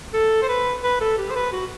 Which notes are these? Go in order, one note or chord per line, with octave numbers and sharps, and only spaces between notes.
A4
C5
B4
B4
A4
G4
C5
B4
F#4